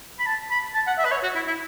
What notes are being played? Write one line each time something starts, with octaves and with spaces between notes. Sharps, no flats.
B5
A5
B5
A5
F#5
E5
B4
C#5
F#4
E4
E4